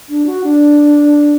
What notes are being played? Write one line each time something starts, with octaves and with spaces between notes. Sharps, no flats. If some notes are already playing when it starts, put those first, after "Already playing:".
D4
F#4
D4